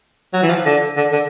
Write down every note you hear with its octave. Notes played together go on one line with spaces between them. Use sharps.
F#3
E3
F3
D3
D3
D3